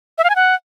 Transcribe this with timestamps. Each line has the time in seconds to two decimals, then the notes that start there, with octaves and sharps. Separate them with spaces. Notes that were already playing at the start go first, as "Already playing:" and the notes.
0.18 E5
0.24 F5
0.30 G#5
0.36 F#5